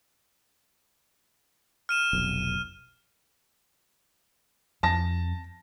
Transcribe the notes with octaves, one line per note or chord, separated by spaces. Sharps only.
F6 D#7 E7
F1 B1
F2 A5 A#6